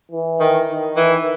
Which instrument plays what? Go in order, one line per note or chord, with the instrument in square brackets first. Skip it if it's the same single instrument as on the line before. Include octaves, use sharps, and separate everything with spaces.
[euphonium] E3
[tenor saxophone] D#3
[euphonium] D#3
[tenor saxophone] E3